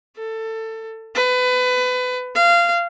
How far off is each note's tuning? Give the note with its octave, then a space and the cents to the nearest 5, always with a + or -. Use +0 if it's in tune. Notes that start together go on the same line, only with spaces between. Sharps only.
A4 +20
B4 +25
F5 -20